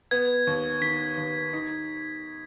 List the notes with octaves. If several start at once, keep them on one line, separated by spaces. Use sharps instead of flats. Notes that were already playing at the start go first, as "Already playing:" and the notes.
B3 G#6
D#2
D#3 B6
D#2
D#4